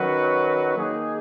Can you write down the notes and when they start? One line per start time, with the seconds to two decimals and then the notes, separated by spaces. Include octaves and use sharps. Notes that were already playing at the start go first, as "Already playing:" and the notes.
Already playing: D#3 F#3 C#4 F#4 B4
0.77 D#3 A#3 D#4 G#4